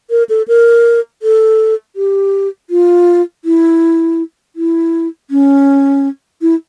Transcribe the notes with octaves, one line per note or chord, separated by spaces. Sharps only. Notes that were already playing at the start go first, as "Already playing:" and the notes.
A#4
A4
A#4
A4
G4
F4
E4
E4
C#4
E4